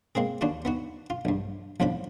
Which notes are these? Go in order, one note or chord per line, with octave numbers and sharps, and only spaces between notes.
G#3 A#3 C4 G#4
D#2 D4 F4 F#4
B3 D#4 F#4
F4
A#1 G2
B1 F2 A2 D3 F3 B5